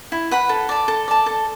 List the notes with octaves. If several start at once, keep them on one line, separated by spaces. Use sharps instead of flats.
E4
B4 F#5 B5
A4
D5 A5
A4
D5 A5
A4